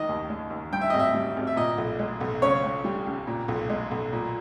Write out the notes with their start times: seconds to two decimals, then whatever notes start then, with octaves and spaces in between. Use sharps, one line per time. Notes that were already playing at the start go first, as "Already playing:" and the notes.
Already playing: C#2 D#3 D#5
0.09 D#2
0.30 G#3
0.50 D#2
0.72 G2 G5
0.81 E5
0.90 G#1 D#5
1.00 E5
1.14 G3
1.36 G#1
1.47 E5
1.57 A#2 D#5
1.78 B1
1.99 G#3
2.21 B1
2.42 C#3 C#5
2.63 C#2
2.84 G3
3.06 C#2
3.27 A#2
3.48 B1
3.70 G#3
3.91 B1
4.13 A#2